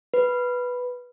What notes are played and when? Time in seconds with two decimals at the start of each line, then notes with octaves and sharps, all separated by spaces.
0.14 B4